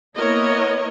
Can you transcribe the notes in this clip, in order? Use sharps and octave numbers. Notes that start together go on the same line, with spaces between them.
A#3 B3 E4 A#4 C#5 D#5